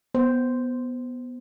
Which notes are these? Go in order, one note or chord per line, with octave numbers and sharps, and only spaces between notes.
B3 C5